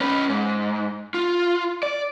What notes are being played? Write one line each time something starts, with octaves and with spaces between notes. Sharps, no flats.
C#4 B4
G#2
F4
D5